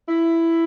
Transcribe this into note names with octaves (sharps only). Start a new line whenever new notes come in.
E4